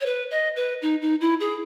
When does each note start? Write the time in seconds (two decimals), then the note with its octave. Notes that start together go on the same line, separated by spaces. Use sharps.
0.01 C#5
0.06 B4
0.31 D#5
0.56 B4
0.82 D#4
1.02 D#4
1.21 E4
1.40 G#4